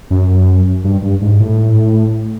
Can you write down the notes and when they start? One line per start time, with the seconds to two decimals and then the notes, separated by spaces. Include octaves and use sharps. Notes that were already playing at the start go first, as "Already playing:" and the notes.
0.10 F#2
0.84 G2
1.02 G2
1.21 G#2
1.40 A2